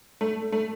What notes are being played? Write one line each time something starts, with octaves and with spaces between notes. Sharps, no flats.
A3
A3